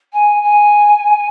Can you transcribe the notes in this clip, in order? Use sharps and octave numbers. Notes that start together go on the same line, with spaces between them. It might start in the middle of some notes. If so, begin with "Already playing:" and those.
G#5
G#5